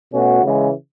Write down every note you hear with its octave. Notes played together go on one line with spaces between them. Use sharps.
B2 A3 C#4 F#4
C#3 E3 G#3